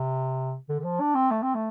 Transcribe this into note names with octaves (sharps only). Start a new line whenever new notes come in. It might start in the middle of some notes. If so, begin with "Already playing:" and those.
Already playing: C3
D3
D3
F3
D4
C4
A3
C4
A3